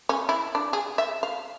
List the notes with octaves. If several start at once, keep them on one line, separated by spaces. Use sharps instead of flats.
C#4
E4
D4
G#4
E5
F5